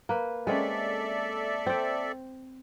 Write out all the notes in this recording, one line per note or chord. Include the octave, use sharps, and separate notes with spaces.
A#3 B4
G#3 C4 C#4 A4 D5 E5
C4 G5